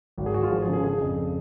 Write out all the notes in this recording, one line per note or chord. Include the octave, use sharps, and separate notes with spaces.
G#1 F#4
G#4
G#1 F#4
F4
F3 G#4
G#4
C#3
G#4
C#3 G#4
F2